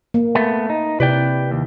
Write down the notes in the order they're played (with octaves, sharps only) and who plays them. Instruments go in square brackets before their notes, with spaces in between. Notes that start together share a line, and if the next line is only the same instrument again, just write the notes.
[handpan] A#3
[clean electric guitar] A3 B3
D#4
[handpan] C3 E4 [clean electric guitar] B4 D5 G5
[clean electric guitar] D#2